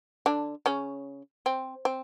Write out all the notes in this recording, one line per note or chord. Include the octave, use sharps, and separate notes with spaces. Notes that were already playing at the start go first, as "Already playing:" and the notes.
D3 D4
C#3 C#4
C4
C4